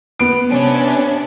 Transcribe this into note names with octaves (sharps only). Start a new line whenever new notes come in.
B3 D7
C3 C#4 D4